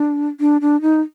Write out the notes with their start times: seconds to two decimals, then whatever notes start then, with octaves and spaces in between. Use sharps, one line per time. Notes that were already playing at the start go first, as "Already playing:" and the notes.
Already playing: D4
0.40 D4
0.61 D4
0.82 D#4